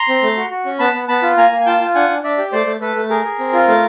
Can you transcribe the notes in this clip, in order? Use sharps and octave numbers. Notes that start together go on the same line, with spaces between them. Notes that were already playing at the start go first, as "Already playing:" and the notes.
Already playing: A#5 C6
C4
A3
F#4
F#4
C#4
B3 A5 B5
B3
B3 A5 B5
F4
A#3 G#5 A#5
A#3
G#5
F4 G5 A5
F4
D4 F#5 G#5
D4
D4 D5 E5
G4
A3 C5 D5
A3
A3 A4 B4
A3
G#4 A#4
G#4
C4
F4
A3